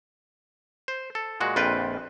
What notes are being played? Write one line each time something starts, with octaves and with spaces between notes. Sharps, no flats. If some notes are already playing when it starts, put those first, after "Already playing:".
C5
A4
A#2 G#3 F#4
A#1 F2 F4 B4 G5